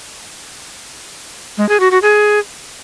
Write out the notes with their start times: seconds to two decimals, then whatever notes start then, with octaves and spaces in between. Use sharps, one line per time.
1.58 G#3
1.69 G#4
1.80 F#4
1.91 F#4
2.02 G#4